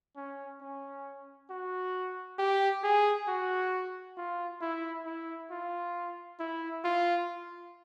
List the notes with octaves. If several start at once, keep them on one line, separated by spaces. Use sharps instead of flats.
C#4
C#4
F#4
G4
G#4
F#4
F4
E4
E4
F4
E4
F4